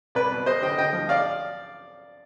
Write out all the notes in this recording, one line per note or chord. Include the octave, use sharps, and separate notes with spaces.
C2 B4 D5
B2
C3 C5 D#5
D2 D#5 G5
D2 D#5 G5
F3
D5 F5